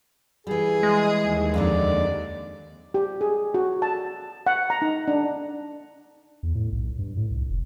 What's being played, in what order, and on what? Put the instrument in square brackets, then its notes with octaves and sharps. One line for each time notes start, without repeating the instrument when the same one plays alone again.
[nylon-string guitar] E3 G3 [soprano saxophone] G#4
[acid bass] G#3 [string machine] D#6
[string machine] D#2
[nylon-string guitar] F2 D3 D#4 [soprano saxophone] D5
[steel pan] G4
G#4
F#4
A5
F#5
A#5
D#4
D4
[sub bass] E2
A2
B1
G2
A2
C2
F1